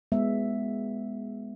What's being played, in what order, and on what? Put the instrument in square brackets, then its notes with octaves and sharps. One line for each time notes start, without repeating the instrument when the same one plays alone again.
[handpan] G#3 B3 E5